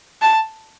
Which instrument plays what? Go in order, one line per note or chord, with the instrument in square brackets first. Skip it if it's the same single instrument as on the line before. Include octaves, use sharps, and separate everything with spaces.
[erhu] A5